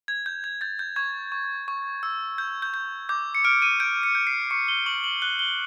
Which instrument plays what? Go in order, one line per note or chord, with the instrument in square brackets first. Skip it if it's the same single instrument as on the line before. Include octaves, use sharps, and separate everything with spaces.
[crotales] G#6
G6
G#6
G6 A6
G6
C#6 G#6
C#6
C#6
E6
G6
G6
G6
D6 G6
C#7
F6 D7
D#7
G6 D7
C#7
G6
C7
C#6 C#7
G7
C#6 F#7
F#7
F#6 G7
G7